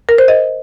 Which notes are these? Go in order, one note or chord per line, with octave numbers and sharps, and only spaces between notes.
A#4
C5
D#5